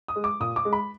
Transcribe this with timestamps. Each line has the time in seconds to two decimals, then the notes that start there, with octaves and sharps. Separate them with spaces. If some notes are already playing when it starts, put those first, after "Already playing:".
0.08 D#6
0.16 G#3
0.24 D6
0.40 A#2 D#6
0.56 D6
0.65 G#3
0.73 B5